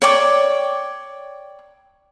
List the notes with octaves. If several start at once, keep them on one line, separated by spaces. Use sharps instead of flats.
C#5 D5 G5 D6